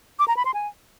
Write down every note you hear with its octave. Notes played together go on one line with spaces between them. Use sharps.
D6
A#5
B5
C6
G#5